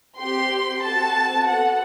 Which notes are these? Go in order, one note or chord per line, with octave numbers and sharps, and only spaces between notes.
C4 G4 C6
C4 F#4 A4 A5
B3 F#4 A4 F#5